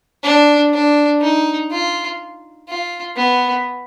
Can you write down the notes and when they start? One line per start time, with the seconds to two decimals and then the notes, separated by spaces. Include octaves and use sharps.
0.23 D4
0.73 D4
1.21 D#4
1.71 F4
2.68 F4
3.16 B3